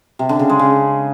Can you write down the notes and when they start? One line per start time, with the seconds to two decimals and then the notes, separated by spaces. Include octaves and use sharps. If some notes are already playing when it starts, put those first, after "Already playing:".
0.19 C3
0.29 D3
0.39 C#3
0.49 G#3
0.59 C#3